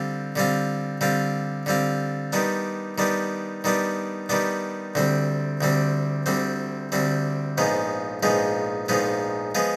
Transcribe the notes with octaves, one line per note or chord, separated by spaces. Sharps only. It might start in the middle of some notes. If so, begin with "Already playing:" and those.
Already playing: D3 G3 C4 F4
D3 G3 C4 F4
D3 G3 C4 F4
D3 G3 C4 F4
D#3 G3 B3 D4
D#3 G3 B3 D4
D#3 G3 B3 D4
D#3 G3 B3 D4
D2 D3 G3 C4
D2 D3 G3 C4
D2 D3 G3 C4
D2 D3 G3 C4
A#1 G#2 F3 G#3 B3
A#1 G#2 F3 G#3 B3
A#1 G#2 F3 G#3 B3
F3 G#3 B3